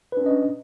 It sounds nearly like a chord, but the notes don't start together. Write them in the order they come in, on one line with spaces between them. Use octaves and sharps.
B4 D4 C#4 D#5